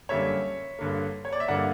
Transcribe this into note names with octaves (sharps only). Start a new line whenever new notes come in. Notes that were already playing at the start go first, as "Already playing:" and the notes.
F#2 D3 G3 A#3 C#5 E5
G2 D3 A#3
C#5
D5
E5
G2 D3 A#3 D5 F#5